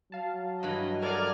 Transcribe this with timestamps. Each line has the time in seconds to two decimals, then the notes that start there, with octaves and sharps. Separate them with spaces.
0.12 F#3 F5 A5
0.63 G2 E3 D#5 B5
1.02 A4 A#4 D5 D#5 F5 F#5 F6 G#6